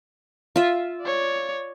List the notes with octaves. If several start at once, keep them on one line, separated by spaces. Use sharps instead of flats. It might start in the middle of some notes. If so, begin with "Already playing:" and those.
F4 E5
C#5 D5